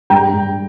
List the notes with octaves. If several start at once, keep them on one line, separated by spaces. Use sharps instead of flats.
G2 G5 A#5
G2